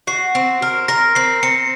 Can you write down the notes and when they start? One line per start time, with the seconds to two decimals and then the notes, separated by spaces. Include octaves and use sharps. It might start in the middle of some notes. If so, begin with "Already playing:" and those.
0.07 F#4 C7
0.35 C4
0.62 A#4
0.88 A#4 A#6
1.15 C4 C7
1.43 C4 C#7